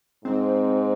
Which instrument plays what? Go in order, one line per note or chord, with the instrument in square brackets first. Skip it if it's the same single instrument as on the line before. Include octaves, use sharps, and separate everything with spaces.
[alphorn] G#2 [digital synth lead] C4